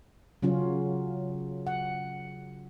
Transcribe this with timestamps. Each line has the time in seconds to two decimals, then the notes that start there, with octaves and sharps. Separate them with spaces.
0.42 C#3 F#3 C#4 F4
1.67 F#5